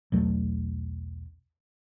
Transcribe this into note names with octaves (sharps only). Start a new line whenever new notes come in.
B1 E2 F#3 A3